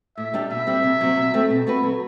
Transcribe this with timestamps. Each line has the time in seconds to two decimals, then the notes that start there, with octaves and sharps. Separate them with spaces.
0.17 A2 E5
0.34 G3 D4 G4
0.50 B2 E5
0.67 G3 C4
0.83 C3
1.01 F#3 C4
1.16 B2
1.34 A3 C4
1.50 B2
1.67 A3 C4 F#4 B4
1.83 F#3